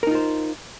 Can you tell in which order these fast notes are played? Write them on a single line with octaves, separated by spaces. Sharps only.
A#4 D#4 F4 C5